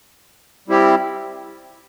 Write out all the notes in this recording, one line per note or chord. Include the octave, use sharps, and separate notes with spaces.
G3 C4 E4 G4